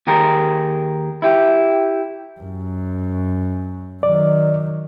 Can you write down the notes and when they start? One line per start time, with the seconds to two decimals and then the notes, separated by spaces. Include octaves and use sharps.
0.07 D#2 G4 G#4 A#4
1.22 E4 G4
2.40 F#2
4.03 D#3 F#3 D5